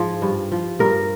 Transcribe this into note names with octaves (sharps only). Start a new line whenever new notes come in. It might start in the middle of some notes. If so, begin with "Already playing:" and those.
Already playing: G#2 F3 G#4
G2
F3
G2 A#4